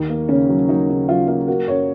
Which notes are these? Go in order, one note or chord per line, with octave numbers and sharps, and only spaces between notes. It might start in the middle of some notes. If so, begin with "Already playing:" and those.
Already playing: D#2 D#4
A#3
C#3 C#4
F#3
F#3 D#4
C#3 D#4
F#3 F4
A#3 F4
A#3 F#4
F#2 C#5